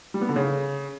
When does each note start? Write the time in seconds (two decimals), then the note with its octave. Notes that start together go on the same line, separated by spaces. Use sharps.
0.14 G3
0.21 B3
0.29 D3
0.36 C#3